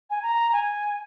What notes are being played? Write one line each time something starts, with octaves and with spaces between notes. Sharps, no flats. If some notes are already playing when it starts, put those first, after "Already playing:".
G#5
A#5
G#5